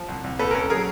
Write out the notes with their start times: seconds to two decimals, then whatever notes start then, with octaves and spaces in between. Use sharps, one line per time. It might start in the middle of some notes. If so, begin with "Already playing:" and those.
Already playing: F3
0.09 C2
0.24 C2
0.39 A#2 A4 B4
0.51 A#4
0.55 C#4 A4
0.70 F#3 G#4 A#4